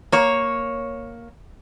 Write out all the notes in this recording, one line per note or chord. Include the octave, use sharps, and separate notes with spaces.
A#3 C#5